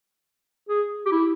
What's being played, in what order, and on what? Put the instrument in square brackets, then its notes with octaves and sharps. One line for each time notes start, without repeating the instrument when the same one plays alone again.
[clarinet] G#4
G4
E4